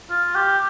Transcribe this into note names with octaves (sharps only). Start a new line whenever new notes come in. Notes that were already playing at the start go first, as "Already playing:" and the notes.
F4
G4